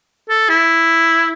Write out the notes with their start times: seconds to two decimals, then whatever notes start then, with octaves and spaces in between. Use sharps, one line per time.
0.29 A4
0.49 E4